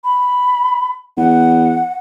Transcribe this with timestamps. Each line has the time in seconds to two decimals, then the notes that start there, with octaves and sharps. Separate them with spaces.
0.04 B5
1.18 E2 F#5